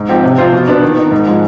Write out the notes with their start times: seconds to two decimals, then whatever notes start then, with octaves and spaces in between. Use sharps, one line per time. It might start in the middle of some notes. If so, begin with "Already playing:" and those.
Already playing: G#2
0.09 F3 C4 G4
0.23 C3
0.38 F3 C4 F4 C5
0.53 B2
0.68 B3 D4
0.82 D#3
0.97 B3 D#4
1.12 G#2
1.27 F3 G#3